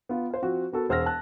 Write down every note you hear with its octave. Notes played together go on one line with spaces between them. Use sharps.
B3 F4
C5 F5
F3 C4 F#4
B3 F#4 A4 A#4
E1 C5 E6 F6 A#6
A5 F#6